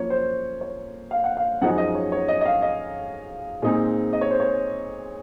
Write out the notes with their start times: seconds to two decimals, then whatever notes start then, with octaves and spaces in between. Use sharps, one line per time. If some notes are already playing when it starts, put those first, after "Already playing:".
Already playing: F#2 F3 A#3 F4 C#5
0.10 C5
0.61 C#5
1.11 F5
1.24 F#5
1.37 F5
1.61 F#2 F3 G#3 D#4 F#5
1.78 D#5
1.95 C#5
2.12 C#5
2.28 D#5
2.41 D#5
2.45 F5
2.62 D#5
3.62 A#2 G#3 C4 D#4
4.13 D#5
4.21 C#5
4.31 C5
4.40 C#5